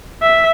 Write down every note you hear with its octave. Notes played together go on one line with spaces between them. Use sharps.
E5